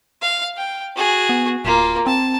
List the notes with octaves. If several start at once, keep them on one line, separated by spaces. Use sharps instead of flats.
F5
G5
F#4 G#4
B3
D1 A#3 F4
C4 A5